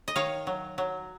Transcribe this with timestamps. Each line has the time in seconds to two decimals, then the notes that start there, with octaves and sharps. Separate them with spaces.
0.08 D#5
0.16 D#3 C#5 F5
0.47 F#3
0.78 F#3